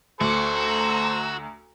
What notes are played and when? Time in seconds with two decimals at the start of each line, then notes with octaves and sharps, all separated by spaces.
0.21 D2 F#4 A4 C5 C#6 D6 C#7
0.51 A#5 E6